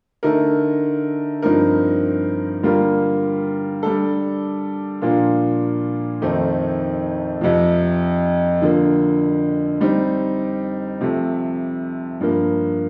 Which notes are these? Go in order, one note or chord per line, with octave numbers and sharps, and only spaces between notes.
D3 A3 D#4 A#4
G2 F3 C4 D#4 A#4
D3 G3 A#3 F4 A#4
G3 D4 A4
A#2 F3 A#3 D4 F4
F2 D#3 A3 C4 D#4
F2 C3 F3
D3 F3 A#3
G3 C4 D#4
C3 F3 A3
G2 F3 A#3